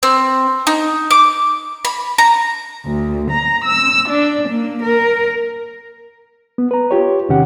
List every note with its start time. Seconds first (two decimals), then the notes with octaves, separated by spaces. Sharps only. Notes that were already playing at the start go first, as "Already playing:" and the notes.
0.03 C4
0.67 D#4
1.11 D6
1.85 B5
2.18 A#5
2.86 D2
3.31 A#5
3.64 E6
4.09 D4
4.48 A#3
4.82 A#4
6.58 B3
6.71 B4 A#5
6.91 F4 G4 C#5
7.29 E2 C3 D#3 C#4 G4 F#5